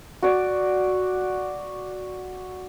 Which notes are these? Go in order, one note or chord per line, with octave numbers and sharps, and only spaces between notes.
F#4 D5